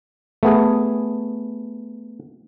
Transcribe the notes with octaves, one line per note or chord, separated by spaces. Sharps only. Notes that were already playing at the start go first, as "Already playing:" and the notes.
A3 B3 G#4